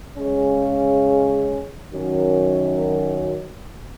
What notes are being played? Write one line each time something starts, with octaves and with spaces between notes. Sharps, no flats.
C#3 G#3 C#4
F#2 D#3 F#3 C#4